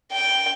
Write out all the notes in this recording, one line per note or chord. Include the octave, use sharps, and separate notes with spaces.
G5